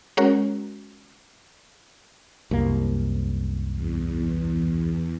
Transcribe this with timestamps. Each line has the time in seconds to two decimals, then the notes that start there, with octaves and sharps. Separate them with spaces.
0.17 G#3 C#4 F#4 A#4 C#5
2.51 C2 F#2 A#3
3.74 E2